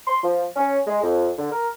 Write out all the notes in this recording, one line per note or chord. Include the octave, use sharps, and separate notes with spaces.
C6
F3
C#4
G#3
F2
D3
A#4